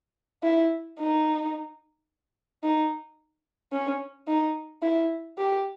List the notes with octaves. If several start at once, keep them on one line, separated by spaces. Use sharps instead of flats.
E4
D#4
D#4
C#4
D#4
E4
G4